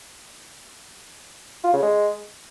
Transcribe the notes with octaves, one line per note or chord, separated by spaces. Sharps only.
F4
C#3
G#3